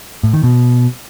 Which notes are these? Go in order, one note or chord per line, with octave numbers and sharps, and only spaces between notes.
A2
D#3
B2